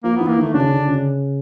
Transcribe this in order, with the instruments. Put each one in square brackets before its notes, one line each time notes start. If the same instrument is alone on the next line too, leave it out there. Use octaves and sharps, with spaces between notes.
[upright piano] F3 [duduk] A#3
[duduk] B3
[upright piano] E3
[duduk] A#3
[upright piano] D#3 [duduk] A3
[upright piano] C#3 [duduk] D4
[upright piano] D3
C#3